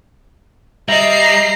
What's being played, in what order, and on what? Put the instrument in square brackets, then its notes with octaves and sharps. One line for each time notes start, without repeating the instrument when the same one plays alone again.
[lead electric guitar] G3 [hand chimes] D#5 E5 [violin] A#5 C7